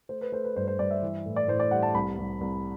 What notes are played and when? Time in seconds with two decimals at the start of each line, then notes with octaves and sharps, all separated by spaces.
0.09 A3 C5
0.21 B4
0.32 A3 C5
0.44 B4
0.56 G2 C5
0.68 C5
0.79 G2 D5
0.91 E5
1.02 E3
1.26 A2
1.36 D5
1.48 A2 C5
1.60 D5
1.71 G3 F#5
1.82 A5
1.94 C2 B5
2.18 C2
2.41 C2